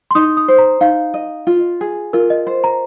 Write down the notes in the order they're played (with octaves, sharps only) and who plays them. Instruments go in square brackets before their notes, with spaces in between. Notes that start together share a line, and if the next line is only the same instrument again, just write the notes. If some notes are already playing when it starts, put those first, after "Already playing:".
[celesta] C6
[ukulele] D#4 [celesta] D#6
[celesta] D#6
[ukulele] C5
[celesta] A#5
[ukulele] D#4 [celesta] F5
[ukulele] D#5
F4
G#4
[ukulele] F4 [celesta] A#4
[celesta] D#5
[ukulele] C5
[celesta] A#5